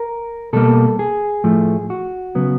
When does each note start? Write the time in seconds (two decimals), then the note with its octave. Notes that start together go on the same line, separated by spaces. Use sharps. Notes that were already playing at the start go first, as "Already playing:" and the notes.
Already playing: A#4
0.53 B2 G3 A#3 A4
0.99 G#4
1.44 A2 F3 A3
1.90 F#4
2.35 C#3 F#3 B3